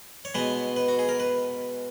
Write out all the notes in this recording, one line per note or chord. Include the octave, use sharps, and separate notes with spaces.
C#5
B2 G#3 B3 B4
B4
F#4
G#4
A#4
B4